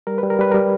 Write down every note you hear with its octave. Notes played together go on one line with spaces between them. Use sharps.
G3 A#4
B4
G3
A#4
G3 B4
G3 A#4